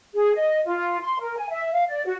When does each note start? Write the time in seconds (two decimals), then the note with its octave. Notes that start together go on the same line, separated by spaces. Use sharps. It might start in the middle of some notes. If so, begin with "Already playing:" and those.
0.14 G#4
0.35 D#5
0.66 F4
1.01 C6
1.20 A#4
1.37 G#5
1.50 E5
1.73 F5
1.88 D5
2.05 F#4